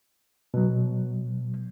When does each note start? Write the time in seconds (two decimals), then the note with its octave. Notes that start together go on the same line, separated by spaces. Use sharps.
0.54 B2 F#3